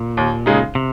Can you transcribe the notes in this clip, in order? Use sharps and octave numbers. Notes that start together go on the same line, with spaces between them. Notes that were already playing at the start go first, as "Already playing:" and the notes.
Already playing: A#2
D#2
C#3 G#3 D#4
C3